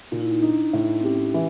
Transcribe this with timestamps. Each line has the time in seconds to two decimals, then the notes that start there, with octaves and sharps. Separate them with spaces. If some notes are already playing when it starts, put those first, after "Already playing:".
0.11 A#2 D#4
0.21 E4
0.31 D#4
0.42 D4 D#4
0.73 A2
1.00 C4
1.03 C#4 G4
1.34 E3